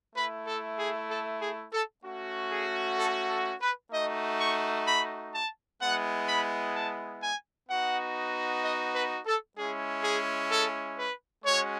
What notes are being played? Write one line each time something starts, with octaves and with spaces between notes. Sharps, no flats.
A3 E4 B4
A4
G#4
A4
G#4
A4
A3 C#4 F#4
G#4
A4
A4
B4
A3 D#4 F#4 D#5
C#6
B5
A5
G#3 B3 E4 F#5
B5
A5
G#5
B3 D#4 F#4 F#5
D#5
B4
A4
G#3 C#4 E4 G#4
G#4
A4
B4
G#3 C#4 F#4 C#5